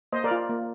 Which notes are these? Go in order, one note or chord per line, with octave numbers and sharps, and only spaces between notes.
A#3 C5 D#5
A#4 D5
F4
A#3